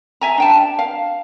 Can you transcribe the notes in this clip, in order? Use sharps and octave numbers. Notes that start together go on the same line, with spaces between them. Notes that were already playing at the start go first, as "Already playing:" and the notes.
E5 G#5 A#5
D4 G5 A5
F5